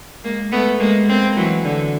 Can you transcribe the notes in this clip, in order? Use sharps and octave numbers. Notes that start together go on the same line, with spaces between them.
G#3 A#3
A3 B3
G#3 A#3
A#3 C4
E3 F#3
D3